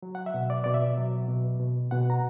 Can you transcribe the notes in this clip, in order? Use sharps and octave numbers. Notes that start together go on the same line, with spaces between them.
F#3
F#5
E5
B2
D5
B2 D5
E5
F#3
B2
B2
B2 F#5
A#5